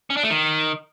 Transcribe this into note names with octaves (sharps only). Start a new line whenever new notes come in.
C#4
D4
A3
D#3